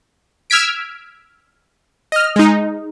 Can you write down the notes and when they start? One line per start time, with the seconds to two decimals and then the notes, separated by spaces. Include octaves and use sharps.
0.50 E6 F6 G#6 B6 D7
2.12 D#5 F6
2.36 G#3 D#4